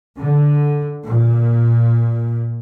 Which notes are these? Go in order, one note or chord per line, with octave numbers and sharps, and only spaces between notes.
D3
A#2